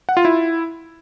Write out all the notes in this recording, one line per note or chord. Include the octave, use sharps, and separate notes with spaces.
F#5
F4
E4